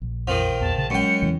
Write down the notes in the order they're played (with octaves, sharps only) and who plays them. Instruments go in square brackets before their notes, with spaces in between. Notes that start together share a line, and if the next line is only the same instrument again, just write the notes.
[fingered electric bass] A#1
[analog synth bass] F2 [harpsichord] D#3 F3
[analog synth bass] E2 [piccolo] A5
[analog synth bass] C#3 [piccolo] A5
[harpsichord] F#2 G5 [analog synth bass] G#3 [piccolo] C#7
[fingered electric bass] E2 C#3 E3